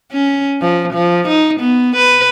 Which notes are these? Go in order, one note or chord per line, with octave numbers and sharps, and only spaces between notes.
C#4
F3
F3
D#4
B3
B4